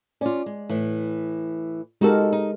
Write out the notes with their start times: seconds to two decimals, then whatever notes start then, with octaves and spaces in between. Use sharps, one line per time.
0.21 C#4 F4 D5
0.46 G#3
0.69 A2 E3
2.01 G#3 D#4 F#4 G4 A4 A#4
2.32 D#4